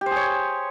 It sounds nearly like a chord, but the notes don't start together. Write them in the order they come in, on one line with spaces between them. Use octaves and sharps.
G4 C5 G#4 C#5